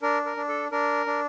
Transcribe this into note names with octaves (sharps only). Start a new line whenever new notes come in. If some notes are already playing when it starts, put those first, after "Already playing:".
D4 A#4
A#4
D4
A4
D4 A#4
D4